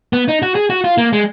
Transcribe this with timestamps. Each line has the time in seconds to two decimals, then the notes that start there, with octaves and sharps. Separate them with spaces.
0.13 B3
0.28 D#4
0.42 F#4
0.55 G#4
0.70 F#4
0.84 F4
0.98 A#3
1.13 G#3